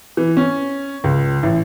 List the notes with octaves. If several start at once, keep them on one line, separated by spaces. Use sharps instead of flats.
E3
C#4
C#2
A1